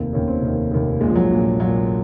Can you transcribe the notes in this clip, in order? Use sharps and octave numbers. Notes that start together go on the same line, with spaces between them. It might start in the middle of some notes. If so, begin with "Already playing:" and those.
Already playing: F1 D#2 D#3 C4
F1 D#2 D#3 C#4
C4
F1 D#2 D#3
F1 D#2 D#3
A#1 A#2 G#3
F3
F#3
A#1 A#2
A#1 A#2 F#3